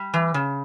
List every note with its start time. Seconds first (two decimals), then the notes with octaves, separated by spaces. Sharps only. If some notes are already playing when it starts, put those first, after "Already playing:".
Already playing: G3
0.14 E3
0.34 C#3